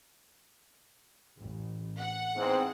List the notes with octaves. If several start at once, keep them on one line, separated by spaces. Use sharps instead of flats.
A1
F#5
E2 G#2 C4